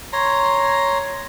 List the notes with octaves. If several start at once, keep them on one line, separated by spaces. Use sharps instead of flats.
C#5 A#5 C6